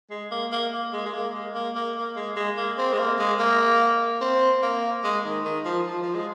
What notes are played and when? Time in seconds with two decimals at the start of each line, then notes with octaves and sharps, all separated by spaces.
0.10 G#3
0.31 A#3
0.52 A#3
0.72 A#3
0.93 G#3
1.06 G#3
1.13 A#3
1.34 G#3
1.55 A#3
1.75 A#3
1.96 A#3
2.16 G#3
2.37 G#3
2.57 A#3
2.78 C4
2.93 G#3
2.99 A#3
3.19 G#3
3.39 A#3
4.21 C4
4.62 A#3
5.04 G#3
5.25 D#3
5.45 D#3
5.65 F3
5.86 F3
6.02 F3
6.15 G#3